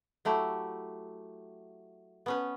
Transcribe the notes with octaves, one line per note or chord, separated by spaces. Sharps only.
F#3 A3 E4 G4
B3 C#4 B4